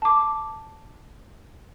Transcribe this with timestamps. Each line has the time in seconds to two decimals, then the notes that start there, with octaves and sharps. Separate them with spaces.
0.02 A5 D6